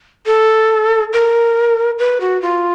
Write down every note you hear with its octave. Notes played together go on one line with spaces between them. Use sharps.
A4
A#4
B4
F#4
F4